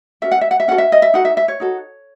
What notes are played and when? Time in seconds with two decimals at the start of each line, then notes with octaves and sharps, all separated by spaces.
0.22 C#4 F#4 A4 E5
0.31 F#5
0.41 E5
0.51 F#5
0.60 E5
0.68 C#4 F#4 A4 F#5
0.78 E5
0.92 D#5
1.02 E5
1.14 D#4 F#4 A4 F#5
1.25 E5
1.37 E5
1.48 C#5
1.60 D#4 F#4 A4